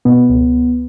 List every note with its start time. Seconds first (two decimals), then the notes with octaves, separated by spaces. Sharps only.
0.05 B2 B3
0.29 C#2